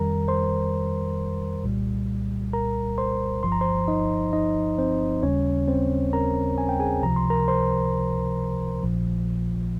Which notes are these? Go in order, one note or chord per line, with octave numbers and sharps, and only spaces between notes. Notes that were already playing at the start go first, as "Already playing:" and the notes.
Already playing: F2 D#3 G3 A#4 A#5
C5 C6
C2 A#2 G3
A#4 A#5
C5 C6
G1 G2 F3 C6
A#5
C5 C6
D#4 D#5
D#4 D#5
C4 C5
D#2 C#3 G3 C#4 C#5
C4 C5
A#4 A#5
G#5
G5
G#4 G#5
C#2 C3 F3 A#5
C6
A#4 A#5
C5 C6
A#1 A#2 F3